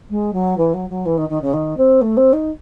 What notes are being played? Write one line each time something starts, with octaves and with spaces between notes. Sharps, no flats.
G#3
F#3
E3
F#3
F#3
E3
D#3
D#3
C#3
D#3
C4
A3
C4
D#4